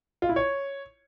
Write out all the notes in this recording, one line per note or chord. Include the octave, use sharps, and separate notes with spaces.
F4
E4
C#5